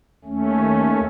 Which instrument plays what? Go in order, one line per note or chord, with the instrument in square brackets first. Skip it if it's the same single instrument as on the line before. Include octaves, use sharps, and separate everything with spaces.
[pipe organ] D#2 A3 C#4